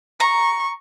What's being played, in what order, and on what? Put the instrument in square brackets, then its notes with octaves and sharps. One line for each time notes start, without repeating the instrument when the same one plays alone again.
[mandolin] A#5 [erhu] C#6